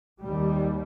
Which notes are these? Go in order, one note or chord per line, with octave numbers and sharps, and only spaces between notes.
D#2 G3